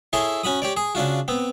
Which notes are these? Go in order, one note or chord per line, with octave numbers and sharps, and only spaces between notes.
E4 G#4 A4 C#5 C6
C#4 F#4 B5 D#6
G4 C#5 D5
G#4
C#3 D4 F4 F#4
B3 C4